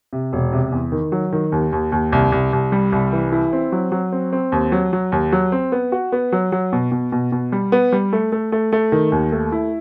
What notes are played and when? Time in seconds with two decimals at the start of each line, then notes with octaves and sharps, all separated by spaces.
0.13 C3
0.33 E1
0.53 C3
0.72 E2
0.92 D#3
1.12 F#3
1.32 D#3
1.52 D#2
1.72 D#2
1.92 D#2
2.12 C2
2.32 C2
2.53 C2
2.72 G3
2.92 C2
3.12 E3
3.32 E4
3.53 C4
3.72 F#3
3.92 F#3
4.12 C4
4.33 C4
4.52 D#2
4.72 F#3
4.93 F#3
5.12 D#2
5.32 F#3
5.52 C4
5.72 B3
5.92 F#4
6.12 B3
6.32 F#3
6.52 F#3
6.73 B2
6.92 B2
7.12 B2
7.32 B2
7.52 G3
7.72 B3
7.92 G3
8.13 A3
8.32 A3
8.52 A3
8.73 A3
8.92 D#3
9.12 D#2
9.32 A3
9.52 E4